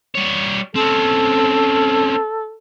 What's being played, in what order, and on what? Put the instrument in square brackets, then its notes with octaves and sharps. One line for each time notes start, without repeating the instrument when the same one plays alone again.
[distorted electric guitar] G3 C#5
[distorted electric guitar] C4 C#4 [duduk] A4